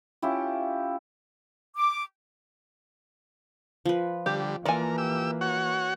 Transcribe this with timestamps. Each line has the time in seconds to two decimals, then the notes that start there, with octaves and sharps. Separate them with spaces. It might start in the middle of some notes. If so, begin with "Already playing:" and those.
0.22 C#4 E4 F4 G4
1.75 D6
3.86 F3 B4
4.26 D3 G3 G4
4.65 E3 A#3 F4 A4 A#4 D5 G#5
4.98 G4 E6
5.41 F#4 C#5 F#5